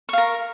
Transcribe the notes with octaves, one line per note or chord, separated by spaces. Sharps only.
A#4 F5 C#6